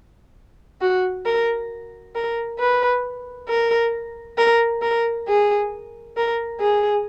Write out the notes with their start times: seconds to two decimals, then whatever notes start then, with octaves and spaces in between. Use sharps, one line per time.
0.81 F#4
1.26 A#4
2.16 A#4
2.59 B4
3.49 A#4
4.38 A#4
4.82 A#4
5.28 G#4
6.17 A#4
6.60 G#4